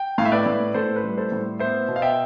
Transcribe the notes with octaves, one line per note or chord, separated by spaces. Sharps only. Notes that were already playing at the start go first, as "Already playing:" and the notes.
Already playing: G5
A2 F5
E5
B4 D5
A2
A2 A4 C5
B4
G3
A4 C5
A2
B3 C5 E5
B2
F5
E5 G5